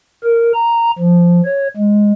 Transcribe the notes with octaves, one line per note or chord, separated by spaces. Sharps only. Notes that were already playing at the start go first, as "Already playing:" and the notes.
A#4
A#5
F3
C#5
G#3